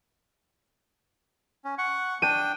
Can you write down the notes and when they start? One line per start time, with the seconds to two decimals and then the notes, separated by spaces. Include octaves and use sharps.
1.64 C#4
1.78 F#5 C#6
2.22 D4 G5 D#7